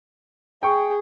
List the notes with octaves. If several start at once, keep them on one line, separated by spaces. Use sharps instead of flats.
G#4 G5 C#6